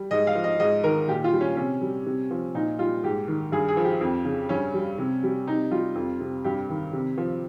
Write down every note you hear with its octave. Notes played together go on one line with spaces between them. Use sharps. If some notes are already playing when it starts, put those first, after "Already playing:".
Already playing: G3
G#2 D#5
F5
F3
D#5
G#2 D#5
D#3 A#4
A#2 G4
F4
G3
C#4
C3 C#4
G3
C3
F3
A#2 D#4
G3 F4
G#2 G4
D#3
G2 G#4
G#4
F3
G4
F2
C#3
G2 C#4
G3
C3
G3
C3 D#4
G3 F4
F2
C3
G2 G4
D#3
C3
F3